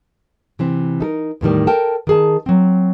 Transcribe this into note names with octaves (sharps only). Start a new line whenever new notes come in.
C3 E3 C4
D#4 A4 A#4
E2 A2 D#3 G3
A4 A#4 G5 A5
D#3 G#4 A5
F#3 C4